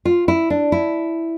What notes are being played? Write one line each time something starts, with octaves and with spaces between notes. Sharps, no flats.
F4
E4
D4
E4